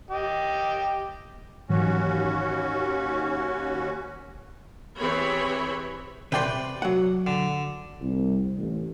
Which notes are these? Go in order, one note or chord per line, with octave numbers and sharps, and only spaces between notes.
G4 D#5
D#2 G#2 E3 F#3 C#4 F#4
E3 C4 G4 G#4 C#5 B5
C3 B4 D5 G5 C6
F#3 F#5
D3
C2
A1